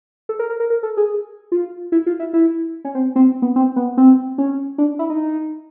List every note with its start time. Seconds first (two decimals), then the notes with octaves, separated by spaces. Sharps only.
0.29 A4
0.39 A#4
0.50 A#4
0.60 A#4
0.70 A#4
0.83 A4
0.97 G#4
1.52 F4
1.92 E4
2.06 F4
2.19 E4
2.33 E4
2.85 C#4
2.95 C4
3.16 C4
3.42 B3
3.56 C4
3.76 B3
3.97 C4
4.38 C#4
4.78 D4
4.99 E4
5.10 D#4